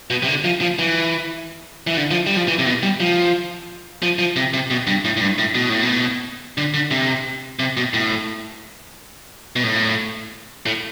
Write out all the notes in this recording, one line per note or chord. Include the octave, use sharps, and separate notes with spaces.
B2
C3
D3
F3
F3
E3
E3
D3
F3
G3
F3
E3
C3
B2
G3
F3
F3
F3
C3
C3
B2
G2
A2
A2
G2
A2
B2
A2
B2
D3
D3
C3
C3
B2
A2
B2
A2
A2